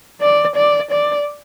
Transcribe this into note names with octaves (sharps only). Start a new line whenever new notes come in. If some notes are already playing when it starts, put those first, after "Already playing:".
D5
D5
D5